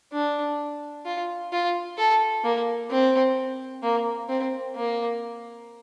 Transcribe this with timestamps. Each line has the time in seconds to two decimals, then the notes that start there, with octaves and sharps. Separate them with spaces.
0.13 D4
1.06 F4
1.52 F4
1.99 A4
2.44 A#3
2.91 C4
3.83 A#3
4.29 C4
4.76 A#3